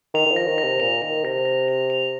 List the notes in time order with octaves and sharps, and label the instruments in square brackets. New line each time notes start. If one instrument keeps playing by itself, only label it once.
[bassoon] D#3 [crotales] F7
[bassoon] D#3
F3
[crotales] A#6
[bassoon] D#3
[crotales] A#6
[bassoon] C3
[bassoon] A#2 [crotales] F7
[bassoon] D#3 [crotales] F7
[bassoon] C3 [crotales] A#6
[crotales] A#6
F7
F7